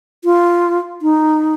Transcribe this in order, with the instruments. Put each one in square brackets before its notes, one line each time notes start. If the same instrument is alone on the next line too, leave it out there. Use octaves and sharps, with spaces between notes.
[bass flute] F4
D#4